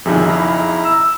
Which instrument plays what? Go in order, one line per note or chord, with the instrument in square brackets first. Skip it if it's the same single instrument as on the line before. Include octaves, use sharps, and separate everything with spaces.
[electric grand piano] B1 F2 [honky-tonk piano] D#3 F3 G3 [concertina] G#4 E5
[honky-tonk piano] C#3 D#5 B5 [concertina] E4 A#5
[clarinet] E6